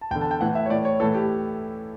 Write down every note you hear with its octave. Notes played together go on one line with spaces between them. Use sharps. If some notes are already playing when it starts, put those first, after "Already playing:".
A5
E2 D3 G5
A5
G5
A2 E3 F#5
E5
C#5
A2 E3 D5
C#5
A2 E3 A4
G4